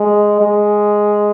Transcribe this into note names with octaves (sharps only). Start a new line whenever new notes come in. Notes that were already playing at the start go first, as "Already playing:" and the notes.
Already playing: G#3
G#3